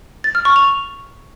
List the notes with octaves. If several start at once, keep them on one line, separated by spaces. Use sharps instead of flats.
A6
F6
C#6
F7